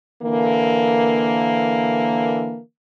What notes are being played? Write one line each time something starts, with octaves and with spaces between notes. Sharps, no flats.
D3 E3 A#3